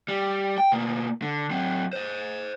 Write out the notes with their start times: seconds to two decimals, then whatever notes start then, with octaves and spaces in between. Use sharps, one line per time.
0.08 G3
0.58 G5
0.72 B2 A#3
1.22 D3
1.51 F#3 C4
1.93 C5 D#5